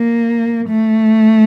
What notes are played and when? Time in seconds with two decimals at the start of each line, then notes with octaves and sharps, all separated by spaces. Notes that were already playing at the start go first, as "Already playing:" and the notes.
Already playing: A#3
0.68 A3